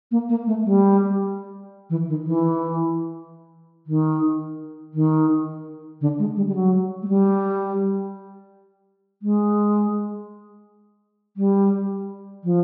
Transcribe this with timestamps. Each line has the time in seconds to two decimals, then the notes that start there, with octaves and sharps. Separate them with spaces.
0.11 A#3
0.29 A#3
0.47 A3
0.65 G3
1.90 E3
2.08 D#3
2.26 E3
3.87 D#3
4.94 D#3
6.01 D3
6.19 G#3
6.36 G3
6.48 G3
6.55 F#3
7.02 G#3
7.08 G3
9.22 G#3
11.37 G3
12.44 F3